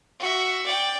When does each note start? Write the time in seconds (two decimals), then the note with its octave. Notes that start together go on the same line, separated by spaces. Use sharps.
0.19 F#4 E5
0.66 D5 G5